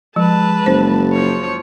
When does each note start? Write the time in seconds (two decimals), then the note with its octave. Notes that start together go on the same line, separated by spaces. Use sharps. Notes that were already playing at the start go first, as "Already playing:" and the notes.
0.16 F3 G#3 B4 A5
0.66 F#1 C5
1.13 F3 C#5